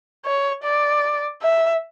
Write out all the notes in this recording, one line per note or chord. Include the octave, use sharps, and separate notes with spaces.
C#5
D5
E5